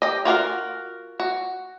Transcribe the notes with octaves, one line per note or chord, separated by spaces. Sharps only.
G4 D#5
F4 F#4 A#4 F5
F#4